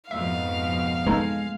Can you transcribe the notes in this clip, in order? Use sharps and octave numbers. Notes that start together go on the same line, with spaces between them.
F2 G#2 B2 E5 F5
E3 G#3 D#4 A4